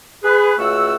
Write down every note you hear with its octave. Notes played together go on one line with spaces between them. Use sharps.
G#4 B4
C#2 C#3 A3 F#4 F#5 E6